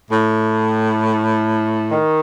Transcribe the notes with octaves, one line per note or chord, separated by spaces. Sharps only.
A2
D#3